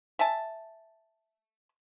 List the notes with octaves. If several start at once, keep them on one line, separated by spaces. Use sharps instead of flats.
E5 G#5 A5